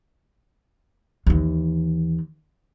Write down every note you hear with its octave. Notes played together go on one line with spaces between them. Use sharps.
D#2 E3